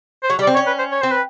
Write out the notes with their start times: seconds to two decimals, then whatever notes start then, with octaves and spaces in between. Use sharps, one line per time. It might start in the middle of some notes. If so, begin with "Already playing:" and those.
0.23 C5
0.30 F#3 C#5
0.39 G3
0.42 D5
0.47 C4
0.54 C#4 C#5
0.67 B4
0.79 C5
0.92 C#5
1.01 C4 C5
1.12 B4